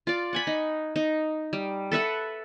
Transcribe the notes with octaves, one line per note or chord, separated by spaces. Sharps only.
F4 D5
F#5 G#5 B5
D#4
D#4
G3
A4 B4 E5 F#5